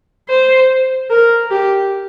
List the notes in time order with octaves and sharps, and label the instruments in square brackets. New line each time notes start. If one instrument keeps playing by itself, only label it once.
[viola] C5
A#4
G4